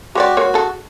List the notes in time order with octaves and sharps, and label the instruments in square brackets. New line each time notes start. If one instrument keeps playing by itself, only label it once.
[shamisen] G#3 C#5 D5 [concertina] F#4 G4
[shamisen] G#3 A#3 C#5 [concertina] F#4
[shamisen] G#4 A4